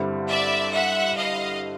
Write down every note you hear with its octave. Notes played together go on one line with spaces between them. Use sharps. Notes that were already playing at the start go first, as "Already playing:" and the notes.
Already playing: G2 D3 G3 C4 E4
D5 E5
E5 F#5
D#5 F5